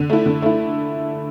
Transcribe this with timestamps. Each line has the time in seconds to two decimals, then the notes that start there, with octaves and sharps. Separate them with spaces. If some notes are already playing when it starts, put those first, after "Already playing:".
Already playing: D3
0.10 A3 E4
0.26 D3
0.42 A3 E4